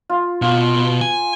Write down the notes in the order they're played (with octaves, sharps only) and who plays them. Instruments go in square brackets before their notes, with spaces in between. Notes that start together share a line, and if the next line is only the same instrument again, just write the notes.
[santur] F4
[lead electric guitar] B2 [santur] F4
[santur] B4
[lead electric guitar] G#5